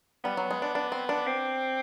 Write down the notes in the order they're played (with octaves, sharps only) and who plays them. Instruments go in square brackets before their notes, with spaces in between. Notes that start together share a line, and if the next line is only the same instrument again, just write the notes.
[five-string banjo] G3 [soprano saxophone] B3
[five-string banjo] F#3
G#3
D4
D4
C4
D4
[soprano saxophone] C4